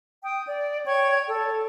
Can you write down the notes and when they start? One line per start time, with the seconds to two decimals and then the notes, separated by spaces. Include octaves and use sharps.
0.23 G5 D#6
0.46 D5
0.85 C#5 G5 C#6 G#6
1.27 A4